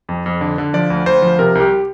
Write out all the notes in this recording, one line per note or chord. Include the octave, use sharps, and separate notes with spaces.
F2
F2
D3
D3
F3 D5
D2
D2 C5
F3
C3 A#4
C2 G4